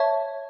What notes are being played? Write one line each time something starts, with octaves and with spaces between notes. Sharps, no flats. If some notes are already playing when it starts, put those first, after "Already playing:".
Already playing: C#5 E5 A5 C#6